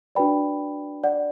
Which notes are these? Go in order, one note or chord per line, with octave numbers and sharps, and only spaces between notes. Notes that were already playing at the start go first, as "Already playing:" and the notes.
D4 F#4 B4 D5 G5 B5
D5 F#5